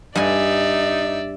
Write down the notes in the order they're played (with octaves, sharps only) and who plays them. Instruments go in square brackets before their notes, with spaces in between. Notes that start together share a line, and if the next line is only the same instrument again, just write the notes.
[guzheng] G2 G#5 [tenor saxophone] D#4 [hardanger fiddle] D5 E5